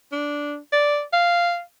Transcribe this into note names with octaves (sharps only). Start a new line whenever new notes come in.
D4
D5
F5